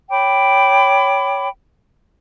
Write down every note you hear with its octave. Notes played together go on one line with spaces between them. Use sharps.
C#5 G5 B5 D6